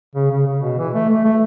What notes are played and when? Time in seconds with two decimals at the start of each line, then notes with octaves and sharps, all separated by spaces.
0.15 C#3
0.31 C#3
0.46 C#3
0.62 B2
0.78 E3
0.94 A3
1.09 A3
1.25 A3